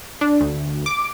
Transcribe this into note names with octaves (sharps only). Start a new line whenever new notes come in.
D4
D2
D6